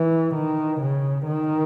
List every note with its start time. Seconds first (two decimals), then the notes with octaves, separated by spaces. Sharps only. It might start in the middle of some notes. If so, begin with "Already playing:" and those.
Already playing: E3
0.35 D#3
0.81 C#3
1.26 D#3